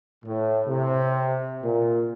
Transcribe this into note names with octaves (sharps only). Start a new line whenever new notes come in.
A2
C3
A#2